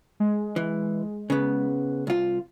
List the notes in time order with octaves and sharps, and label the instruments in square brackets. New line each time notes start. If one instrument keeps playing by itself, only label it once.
[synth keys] G#3
[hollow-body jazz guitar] E3
C#3 B3
C2 F4